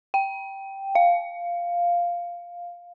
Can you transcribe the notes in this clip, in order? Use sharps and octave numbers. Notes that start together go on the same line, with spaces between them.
G5
F5